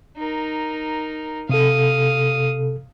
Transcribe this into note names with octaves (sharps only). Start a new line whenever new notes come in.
D#4 A#4
C3 A4 F5 D#6